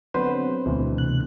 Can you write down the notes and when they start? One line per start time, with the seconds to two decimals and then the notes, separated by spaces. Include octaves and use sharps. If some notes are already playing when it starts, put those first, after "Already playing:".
0.14 D3 F#3 B3 C4 B4 C5 C6
0.66 D2 B2 E3
0.98 C3 F#6